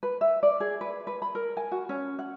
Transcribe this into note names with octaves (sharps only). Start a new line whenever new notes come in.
B4
E5
D5
G#4
B4
B4
B5
A#4
G#5
F#4
C#4
F#5